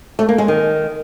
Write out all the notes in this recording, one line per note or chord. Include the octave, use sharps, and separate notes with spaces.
A3
A#3
G#3
D#3